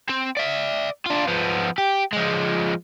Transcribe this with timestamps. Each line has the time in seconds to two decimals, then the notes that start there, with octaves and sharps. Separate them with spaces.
0.09 C4
0.37 D5 E5
1.06 D4 F4
1.27 F3 B3
1.78 G4
2.13 F3 G#3